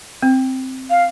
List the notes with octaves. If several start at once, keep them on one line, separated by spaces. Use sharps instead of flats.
C4
F5